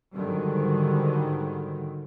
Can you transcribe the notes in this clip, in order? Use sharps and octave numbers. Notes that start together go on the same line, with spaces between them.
G#2 D3 D#3 F#3 G3